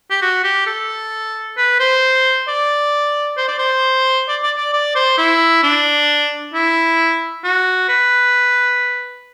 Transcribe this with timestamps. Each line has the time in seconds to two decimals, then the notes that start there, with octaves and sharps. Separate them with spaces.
0.10 G4
0.22 F#4
0.44 G4
0.67 A4
1.57 B4
1.80 C5
2.48 D5
3.37 C5
3.48 D5
3.59 C5
4.28 D5
4.43 D5
4.57 D5
4.73 D5
4.96 C5
5.18 E4
5.63 D4
6.54 E4
7.44 F#4
7.89 B4